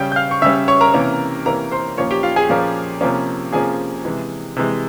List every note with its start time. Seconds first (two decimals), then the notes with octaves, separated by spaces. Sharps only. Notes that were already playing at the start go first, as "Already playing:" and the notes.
Already playing: C#3 G3 C#4 G5 G6
0.12 G6
0.16 F5 F6
0.31 C#6
0.42 C#3 G3 C#4 E5 E6
0.68 C#5 C#6
0.81 A#4 A#5
0.94 C3 E3 A#3 C#4
1.46 C3 E3 A#3 C#4 A#4 A#5
1.72 C5 C6
1.97 A#2 F3 A#3 C#4 C#5 C#6
2.11 G4 G5
2.23 F4 F5
2.36 G#4 G#5
2.49 A#2 F3 A#3 C#4
3.01 C3 F3 A#3 C#4
3.53 C3 F3 A#3 C#4 G#4 G#5
4.05 C3 E3 G#3
4.56 C3 E3 G#3